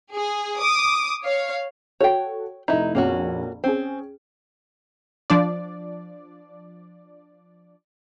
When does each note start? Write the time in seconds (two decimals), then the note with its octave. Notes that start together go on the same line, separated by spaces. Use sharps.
0.13 G#4
0.60 D6 D#6
1.22 C#5 F5
2.00 F#4 A4 C#5 G5
2.68 F1 D#4 E4 A#5
2.95 A#1 F2 A#3 C#4 F#4
3.64 C4 C#4 G#4
5.30 F3 D4 D5